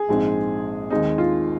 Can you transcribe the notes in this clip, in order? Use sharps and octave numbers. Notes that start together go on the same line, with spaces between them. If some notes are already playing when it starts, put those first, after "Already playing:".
Already playing: G#4
A#1 G#2 G#3 C4
D#2 D#3 G#3 C4 D#4
F4